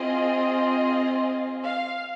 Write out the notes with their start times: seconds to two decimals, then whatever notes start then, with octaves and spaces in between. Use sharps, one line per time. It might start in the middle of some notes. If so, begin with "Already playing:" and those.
Already playing: C4 F4 G#4 D#5
1.64 F5